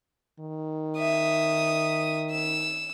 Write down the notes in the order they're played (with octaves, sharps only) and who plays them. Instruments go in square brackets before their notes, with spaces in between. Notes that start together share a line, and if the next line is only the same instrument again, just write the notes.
[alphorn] D#3
[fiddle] E5 D#6
E6